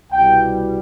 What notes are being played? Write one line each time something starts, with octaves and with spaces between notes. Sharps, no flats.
C2 B2 G3 G5